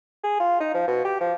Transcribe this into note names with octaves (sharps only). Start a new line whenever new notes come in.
G#4
F4
D#4
F3
B2
G4
F3